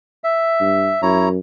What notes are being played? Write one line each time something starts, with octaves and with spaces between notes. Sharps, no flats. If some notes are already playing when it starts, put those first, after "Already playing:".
E5
G2
F#2 E4 C#5 A#5